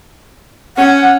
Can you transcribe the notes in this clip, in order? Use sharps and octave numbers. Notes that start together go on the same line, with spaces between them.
C#4 F#5